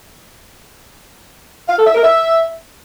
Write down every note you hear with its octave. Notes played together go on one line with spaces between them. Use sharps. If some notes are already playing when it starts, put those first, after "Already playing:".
F5
A4
E5
A#4
E5